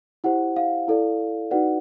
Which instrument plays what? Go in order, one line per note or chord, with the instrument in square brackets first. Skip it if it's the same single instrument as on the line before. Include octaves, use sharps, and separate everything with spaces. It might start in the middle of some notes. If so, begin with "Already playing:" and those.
[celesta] E4 G4 C5 F#5
F5
E4 A4 D5
D#4 F#4 B4 D5 F#5